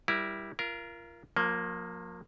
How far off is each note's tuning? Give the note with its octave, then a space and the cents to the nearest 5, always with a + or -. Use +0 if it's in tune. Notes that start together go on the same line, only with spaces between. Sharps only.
G3 +0 E4 +0 A#4 +30
F4 -30 A#4 +10
F3 +40 A#3 +0